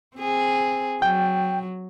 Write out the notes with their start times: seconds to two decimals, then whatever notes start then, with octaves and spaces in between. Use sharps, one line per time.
0.17 C4 G#4
1.02 F#3 G5